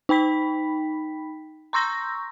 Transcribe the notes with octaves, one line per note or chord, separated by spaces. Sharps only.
D#4 G5 B5 B6
A#5 C6 C#6 E6 G6 A#6